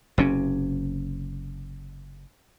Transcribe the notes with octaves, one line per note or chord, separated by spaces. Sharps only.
F#1 C3 C#4